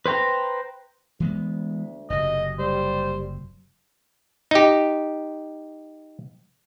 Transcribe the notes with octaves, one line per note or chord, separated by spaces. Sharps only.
B4 C5 G5 A#5
D2 E3 G#3 B3
F#1 C3 F#3 D#5
G3 C5
D#4 G4